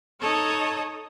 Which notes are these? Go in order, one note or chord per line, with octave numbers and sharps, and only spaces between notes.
D#4 A4 C#5 C#6 D#6